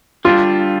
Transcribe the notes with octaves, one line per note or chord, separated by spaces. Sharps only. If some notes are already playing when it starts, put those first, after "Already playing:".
D3 G3 D4 F4